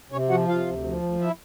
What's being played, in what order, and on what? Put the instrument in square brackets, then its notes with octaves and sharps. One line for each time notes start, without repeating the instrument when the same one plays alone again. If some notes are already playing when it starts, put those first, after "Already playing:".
[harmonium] C3 C#4 C#5
F3 F#4 F#5
C3 F4 F5
D2
F3
D2
E4 E5